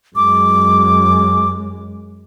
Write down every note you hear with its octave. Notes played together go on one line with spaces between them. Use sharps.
F#2 G#3 D6